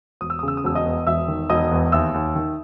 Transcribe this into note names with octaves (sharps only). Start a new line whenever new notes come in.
E1 D#6
E6
C#3 D#6
E6
D#6
E1 E6
D#5 D#6
E2
E1 E5 E6
D#3
E1 D#5 D#6
E2
D#2 E5 E6
D#2
D#3